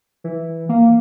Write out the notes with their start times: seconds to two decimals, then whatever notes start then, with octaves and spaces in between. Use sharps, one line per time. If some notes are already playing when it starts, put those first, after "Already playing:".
0.24 E3
0.69 A#3